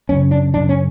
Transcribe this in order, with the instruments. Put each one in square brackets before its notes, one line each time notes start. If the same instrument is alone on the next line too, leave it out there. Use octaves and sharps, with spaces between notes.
[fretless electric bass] F#2 C#3 C#4
D4
F#2 C#3 D4
C#4